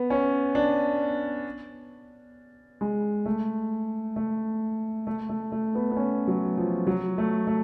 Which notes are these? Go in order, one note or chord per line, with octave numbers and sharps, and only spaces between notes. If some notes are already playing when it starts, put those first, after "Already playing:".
Already playing: B3
C#4
D4
G#3
A3
A3
A3
A3
A3
B3
B3
C#4
F#3
F3
F#3
A3
A3